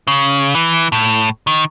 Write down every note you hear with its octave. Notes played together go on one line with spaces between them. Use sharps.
C#3
E3
A2
D#3